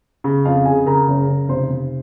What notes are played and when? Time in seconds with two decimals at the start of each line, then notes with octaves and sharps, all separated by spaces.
0.24 C#3
0.45 F2 F4 F5
0.65 C#3 G#4 G#5
0.86 C#3 A#4 A#5
1.08 F#1
1.28 C#3
1.49 F1 C5 C6
1.70 F1